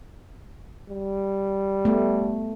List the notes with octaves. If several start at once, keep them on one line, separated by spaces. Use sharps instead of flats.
G3
A3 B3